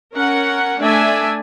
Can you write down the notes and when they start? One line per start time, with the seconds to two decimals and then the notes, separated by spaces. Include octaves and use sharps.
0.15 C#4 A#4 F#5
0.81 A3 D4 D5 E5 G#5